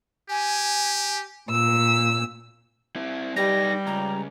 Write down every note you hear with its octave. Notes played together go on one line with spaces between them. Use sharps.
G4 G#5
A#2 E6
C4 E4
G3 D#4 B4 A#6
C#2 A#5